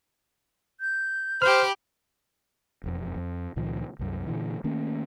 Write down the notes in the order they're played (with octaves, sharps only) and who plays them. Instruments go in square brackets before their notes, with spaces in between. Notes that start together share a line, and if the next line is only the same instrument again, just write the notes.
[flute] G6
[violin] G4 B5 [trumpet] C5 [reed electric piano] F6
[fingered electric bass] E1 F2
F2
C#2 A#2 D#3 F3
C2 F#2
A#2 D3 E3
D#3 A3 A#3 C#4